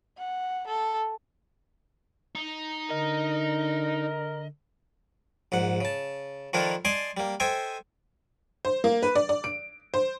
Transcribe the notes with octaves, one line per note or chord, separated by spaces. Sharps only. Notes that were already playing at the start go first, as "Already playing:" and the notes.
F#5
A4
D#4
D3 A#4 D#5
A#1 G#2 F#5
C#3 A5
D#3 F3 D4 E4 A4 A#4
D5 D#5 G#5 A5 C6 D6
G3 A#3
A4 C5 D#5 E5 G5 G#5
C5
A#3
B4
D5
D5
D7
C5